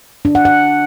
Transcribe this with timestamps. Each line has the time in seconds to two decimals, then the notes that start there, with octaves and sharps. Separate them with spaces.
0.25 D4
0.35 F#5
0.45 F#5